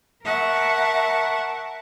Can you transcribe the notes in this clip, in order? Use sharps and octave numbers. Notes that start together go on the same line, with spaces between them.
A#4 E5 F#5 A5 C#6